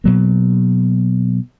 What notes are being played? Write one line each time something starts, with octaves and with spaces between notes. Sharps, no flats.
B2 F#3 A#3